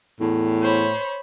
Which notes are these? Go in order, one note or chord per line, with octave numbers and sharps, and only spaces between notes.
E2 A2
C5 C#5 B5